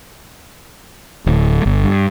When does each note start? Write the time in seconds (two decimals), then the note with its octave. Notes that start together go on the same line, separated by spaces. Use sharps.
1.26 D1
1.66 G1
1.84 G2